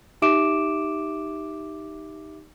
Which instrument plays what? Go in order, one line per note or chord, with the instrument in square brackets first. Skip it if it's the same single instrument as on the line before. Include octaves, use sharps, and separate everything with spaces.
[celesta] D#4 G4 E5 D6 D7 E7